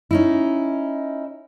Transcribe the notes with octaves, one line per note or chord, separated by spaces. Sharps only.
C#4 D#4 E4